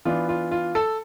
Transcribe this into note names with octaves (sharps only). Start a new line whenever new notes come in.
E3 B3 D4 F4
F4
F4
A4